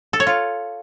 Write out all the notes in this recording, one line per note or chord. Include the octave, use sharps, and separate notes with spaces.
A4
C#5
F4